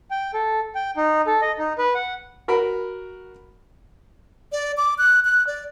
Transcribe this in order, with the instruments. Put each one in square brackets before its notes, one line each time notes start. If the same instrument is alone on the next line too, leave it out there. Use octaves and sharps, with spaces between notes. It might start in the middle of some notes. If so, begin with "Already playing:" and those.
[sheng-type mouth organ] G5
A4
G5
D#4
A4
D#5
D#4
B4
F#5
[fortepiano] F#4 A#4 B5
[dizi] D5
D6
F#6
F#6
D5